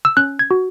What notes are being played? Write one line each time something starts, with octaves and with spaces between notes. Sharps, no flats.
E6
C#4 F#6
G#6
F#4